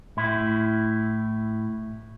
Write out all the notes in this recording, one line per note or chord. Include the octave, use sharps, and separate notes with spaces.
A2 E4